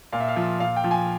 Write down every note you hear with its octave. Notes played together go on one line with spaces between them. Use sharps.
A#2 F5
E5
F5
F3
A#2 F5
G5
F3
G#5